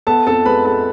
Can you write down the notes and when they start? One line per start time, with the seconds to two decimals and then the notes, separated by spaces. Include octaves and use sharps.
0.07 B3 A4 A5
0.27 F2 A4 A5
0.45 G#3 B4 B5
0.65 G#3 A4 A5